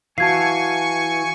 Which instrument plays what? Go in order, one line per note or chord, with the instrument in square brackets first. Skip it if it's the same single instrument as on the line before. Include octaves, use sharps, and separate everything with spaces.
[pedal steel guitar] E3 [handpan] F#4 F5 [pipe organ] G#5 C#6 [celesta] A5 G#6 C7